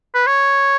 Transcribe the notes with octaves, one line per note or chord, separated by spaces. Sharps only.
B4
C#5